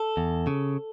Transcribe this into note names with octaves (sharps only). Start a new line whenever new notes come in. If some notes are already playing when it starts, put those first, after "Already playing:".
Already playing: A4
E2
C#3